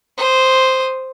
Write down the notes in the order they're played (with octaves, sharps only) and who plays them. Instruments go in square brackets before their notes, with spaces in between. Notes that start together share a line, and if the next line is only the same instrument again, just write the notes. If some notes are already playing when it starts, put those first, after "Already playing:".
[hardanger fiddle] C5 D#6